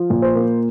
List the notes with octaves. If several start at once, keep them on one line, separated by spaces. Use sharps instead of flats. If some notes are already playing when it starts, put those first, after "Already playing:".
Already playing: F3
A#2
C5
A#3